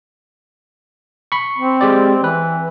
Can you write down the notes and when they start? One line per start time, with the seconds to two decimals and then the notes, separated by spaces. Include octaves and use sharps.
1.32 B5 C#6
1.58 C4
1.81 G#3 G4 D5
2.24 E3 B4